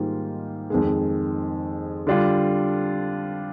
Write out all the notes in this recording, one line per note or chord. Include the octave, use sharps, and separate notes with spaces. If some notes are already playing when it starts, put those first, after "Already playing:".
Already playing: G#2 D#3 G3 A#3 F4
F2 D#3 G#3
D3 G3 D4 F4